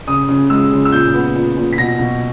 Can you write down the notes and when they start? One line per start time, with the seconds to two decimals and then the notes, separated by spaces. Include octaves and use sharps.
0.07 C#3 D#6
0.29 C#3
0.50 G#3 E6
0.72 C#3
0.85 E6
0.92 A#2 G6
1.14 B3
1.35 A#2
1.56 A#2
1.73 B6
1.78 B2 A#6
1.99 B2